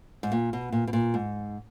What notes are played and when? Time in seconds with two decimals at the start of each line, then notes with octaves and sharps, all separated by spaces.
0.23 G#2
0.32 A#2
0.53 B2
0.72 A#2
0.87 B2
0.93 A#2
1.14 G#2